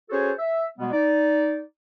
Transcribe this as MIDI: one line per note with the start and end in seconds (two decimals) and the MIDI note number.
0.10 0.31 61
0.10 0.31 66
0.10 0.31 68
0.10 0.31 69
0.10 0.31 72
0.10 0.31 73
0.39 0.64 76
0.79 0.90 47
0.79 0.90 55
0.79 0.90 56
0.79 0.90 59
0.92 1.60 63
0.92 1.60 74